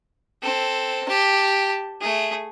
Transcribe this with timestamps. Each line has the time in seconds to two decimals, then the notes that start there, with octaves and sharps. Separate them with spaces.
0.43 C4 A4
1.08 G4 A5
2.01 A3 G#4